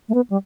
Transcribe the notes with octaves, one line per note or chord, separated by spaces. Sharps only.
A3
B3
G3